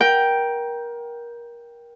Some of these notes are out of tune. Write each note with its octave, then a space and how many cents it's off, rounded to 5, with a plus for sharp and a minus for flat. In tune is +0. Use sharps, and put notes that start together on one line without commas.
A#4 +25 G5 +0